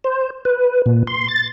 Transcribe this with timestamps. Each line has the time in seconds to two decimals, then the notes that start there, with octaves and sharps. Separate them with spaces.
0.04 C5
0.45 B4
0.86 A#2
1.07 C6
1.29 A6